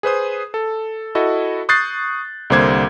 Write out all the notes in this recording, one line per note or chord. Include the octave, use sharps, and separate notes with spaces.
G#4 B4 C5 D#6
A4
E4 F#4 A4 D#5
C#6 D#6 F#6 G6 A6 C7
C2 D3 A#3 C5 D6 G#6